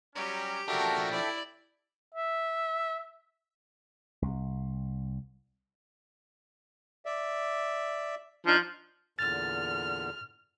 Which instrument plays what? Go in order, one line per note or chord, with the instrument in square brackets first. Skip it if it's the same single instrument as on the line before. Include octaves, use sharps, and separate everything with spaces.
[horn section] F#3 G3 C#4 [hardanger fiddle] G4 [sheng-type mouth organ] A#5
[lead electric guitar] F3 D4 [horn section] F#4 A#4 [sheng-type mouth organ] A4 E5 G5
[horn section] E4 [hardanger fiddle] D5
[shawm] E5
[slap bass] C2
[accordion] D5 E5
[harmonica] F3 [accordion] D4 D#4 F4
[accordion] E2 A#2 D3 [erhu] F6 [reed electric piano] A6